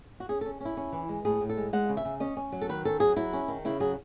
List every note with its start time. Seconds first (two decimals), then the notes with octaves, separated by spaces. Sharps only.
0.20 F#4
0.29 C#4 G#4
0.41 A4
0.46 C#4
0.61 C#4 E4
0.77 C#4
0.92 E3
1.09 G#3
1.25 A2 G#4
1.41 A2
1.49 A4
1.57 G#3
1.73 G#3 F#5
1.89 C#3
1.97 E5
2.05 C#3
2.20 C#4 D#5
2.37 C#4
2.52 F#3
2.61 A4
2.69 D#3 B4
2.85 C#4 A4
3.00 F#3 G#4
3.16 F#3 E4
3.33 C#4
3.48 D#3
3.65 C#3 E4
3.80 F#3 G#4